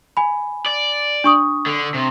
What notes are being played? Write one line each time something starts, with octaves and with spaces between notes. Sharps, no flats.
G#5 B5
D5
D4 C#6 D#6
D3
C3